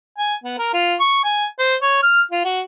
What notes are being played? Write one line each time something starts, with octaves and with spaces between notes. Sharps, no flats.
G#5
B3
A#4
F4
C#6
G#5
C5
C#5
F6
F4
F#4